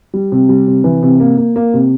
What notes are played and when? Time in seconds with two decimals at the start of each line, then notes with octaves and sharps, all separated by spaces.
0.14 G3
0.32 C3
0.49 G3
0.67 C3
0.84 E3
1.03 C3
1.20 A#3
1.37 A#3
1.56 A#3
1.74 C3